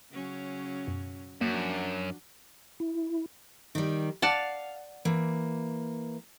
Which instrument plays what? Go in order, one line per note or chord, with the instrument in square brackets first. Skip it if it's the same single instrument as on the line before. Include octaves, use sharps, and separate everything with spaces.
[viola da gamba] C#3 F#3 C#4
[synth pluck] F#2 B2
[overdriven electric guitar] F#2 [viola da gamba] F3 D4 F#4 [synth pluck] A#3
[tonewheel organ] E4
[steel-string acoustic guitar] D#3 G3
[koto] D5 F#5 A5 [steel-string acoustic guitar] F5
[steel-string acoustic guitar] E3 A#3